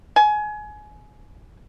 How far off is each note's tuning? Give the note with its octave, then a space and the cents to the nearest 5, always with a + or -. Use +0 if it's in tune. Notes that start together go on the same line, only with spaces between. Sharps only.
G#5 +25